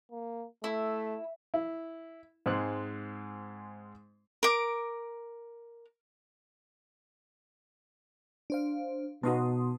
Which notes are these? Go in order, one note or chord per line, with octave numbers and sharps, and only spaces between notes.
A#3
A3 E4
E4
G#2 G#3 C4 F#6
A#4 D6
D4 C5 F5
B2 B3 D#4 F#4 A5 C6 D#6